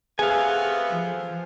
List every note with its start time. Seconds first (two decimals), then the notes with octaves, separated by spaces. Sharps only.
0.19 C3 A3 B3 G#4 F5 G#5
0.91 F3